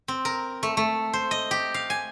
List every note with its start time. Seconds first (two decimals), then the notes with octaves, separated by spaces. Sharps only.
0.08 C4
0.25 A#4
0.63 A3
0.77 A3
1.13 C5
1.31 D#5
1.51 G4
1.74 F5
1.90 G#5